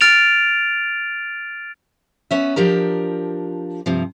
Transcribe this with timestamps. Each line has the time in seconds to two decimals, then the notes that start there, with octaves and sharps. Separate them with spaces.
0.01 F6 A6 D7 F7
2.31 B3 C#4 E5
2.56 F3 D4 G4 A#4
3.86 G2 C3 F3